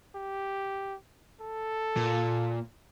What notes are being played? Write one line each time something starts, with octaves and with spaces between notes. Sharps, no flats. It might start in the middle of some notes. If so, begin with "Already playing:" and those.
G4
A4
A#2